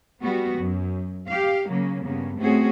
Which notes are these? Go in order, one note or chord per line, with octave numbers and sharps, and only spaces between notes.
G3 B3 F#4
F#2
G4 F5
C#3 F#3 A#3
G2 C#3 A#3 B3
A3 C4 C#4 F#4 G#4